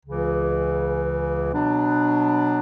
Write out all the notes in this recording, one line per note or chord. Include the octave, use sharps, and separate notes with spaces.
C#2 C#3 E3
B2 F#3 B3 D4